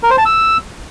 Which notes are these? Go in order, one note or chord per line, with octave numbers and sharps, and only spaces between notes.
A#4
C5
A5
E6